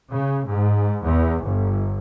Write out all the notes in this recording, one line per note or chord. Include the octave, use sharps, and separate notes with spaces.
C#3
G#2
E2
G1